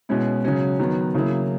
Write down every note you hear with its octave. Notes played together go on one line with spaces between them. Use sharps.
B2 G#3 C#4 E4
C#3 F#3 C#4 F#4
D#3 F#3 B3
C#3 F#3 A#3 E4